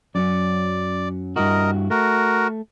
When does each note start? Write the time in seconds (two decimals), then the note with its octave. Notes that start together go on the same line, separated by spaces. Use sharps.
0.15 F#2 F#3 C#4 D5
1.36 G2 E4 F#4 A#4 D#5
1.90 A3 F#4 A#4